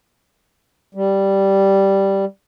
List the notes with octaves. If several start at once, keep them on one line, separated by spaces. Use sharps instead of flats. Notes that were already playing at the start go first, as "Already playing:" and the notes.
G3